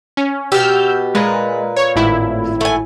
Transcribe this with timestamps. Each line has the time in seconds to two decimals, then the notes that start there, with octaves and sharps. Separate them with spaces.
0.17 C#4
0.52 B2 G4 E6 F6 G6
1.15 A#2 G#3 A#4 B4
1.76 C#5
1.96 G#1 A2 E4
2.61 A3 G#5